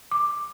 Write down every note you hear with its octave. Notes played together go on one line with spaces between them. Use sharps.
D6